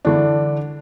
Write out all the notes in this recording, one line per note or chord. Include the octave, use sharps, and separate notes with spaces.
D3 E3 D4